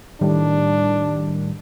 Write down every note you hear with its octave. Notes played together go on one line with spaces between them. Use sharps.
A2 D#3 G3 D4